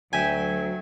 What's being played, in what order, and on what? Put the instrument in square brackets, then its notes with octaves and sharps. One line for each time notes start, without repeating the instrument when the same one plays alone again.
[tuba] D2 [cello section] F#3 [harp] E5 G5 G#5